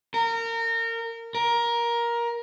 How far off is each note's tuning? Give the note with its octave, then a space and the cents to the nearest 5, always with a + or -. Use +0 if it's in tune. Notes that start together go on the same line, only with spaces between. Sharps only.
A#4 -25
A#4 +15